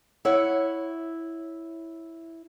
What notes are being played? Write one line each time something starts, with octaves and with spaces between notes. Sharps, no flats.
E4 C#5 E5 F#5